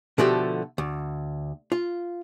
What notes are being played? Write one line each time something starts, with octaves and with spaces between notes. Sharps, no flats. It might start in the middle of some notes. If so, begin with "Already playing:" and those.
B2 D3 F3 A3 F#4 G4
D2
F4